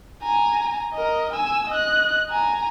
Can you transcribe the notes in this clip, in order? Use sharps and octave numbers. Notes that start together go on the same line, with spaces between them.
G#5 A#5
A#4 D#5
G#5 E6
D#5 F#6
G#5 A#5